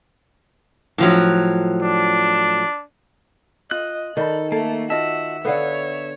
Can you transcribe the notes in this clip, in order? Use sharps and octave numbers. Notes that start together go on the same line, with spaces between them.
A2 F3 F#3
D4
F4 D#5 F#6
D#3 A4 D5 B5
A3 A#3 A4
F4 F#4 D#5 E5 A5
D3 B3 A4 C#5 F5 F#5